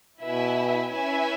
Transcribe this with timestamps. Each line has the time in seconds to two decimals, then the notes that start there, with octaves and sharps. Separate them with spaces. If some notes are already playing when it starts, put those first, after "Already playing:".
0.22 B2 E4 B4 E5 G#5
0.92 C#4 E4 B4 E5 G#5